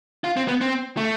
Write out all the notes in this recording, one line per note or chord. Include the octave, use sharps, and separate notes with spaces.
F4
C4
B3
C4
A3